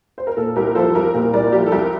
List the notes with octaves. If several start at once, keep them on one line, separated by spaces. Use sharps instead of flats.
C5
A#4
A#2 A4
C2 G4 A#4
F3 A4 C5
C2 G4 A#4
A#2 G4 A#4
C2 A#4 D5
F3 G4 A#4
A4
C2 G4 A#4